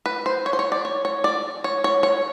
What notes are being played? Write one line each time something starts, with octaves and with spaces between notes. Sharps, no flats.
B4
C5
C#5
C5
C#5
D5
C#5
C#5
D5
C#5
C#5
C#5